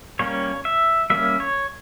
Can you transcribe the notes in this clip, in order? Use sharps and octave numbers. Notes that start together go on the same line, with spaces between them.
G3 A#3 C#4 C#5
E5
G3 A#3 C#4 E5
C#5